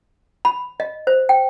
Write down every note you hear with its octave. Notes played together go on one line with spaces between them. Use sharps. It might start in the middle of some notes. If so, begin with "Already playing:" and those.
B5
D#5
C5
G5